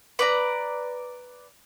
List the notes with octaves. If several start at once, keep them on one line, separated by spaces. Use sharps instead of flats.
B4 D5 A#5